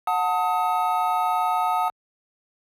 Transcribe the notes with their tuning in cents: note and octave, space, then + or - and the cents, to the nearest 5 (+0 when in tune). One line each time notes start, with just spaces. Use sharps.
F#5 -20 A5 +20 D#6 +25